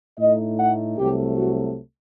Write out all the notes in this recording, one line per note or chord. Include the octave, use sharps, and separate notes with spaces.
A2 A3 D#4 D#5
F#5
C2 C3 F#3 A3 G4
F#4